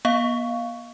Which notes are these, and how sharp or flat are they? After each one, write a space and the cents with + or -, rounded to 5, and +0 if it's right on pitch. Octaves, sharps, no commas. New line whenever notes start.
B3 -45 F5 +0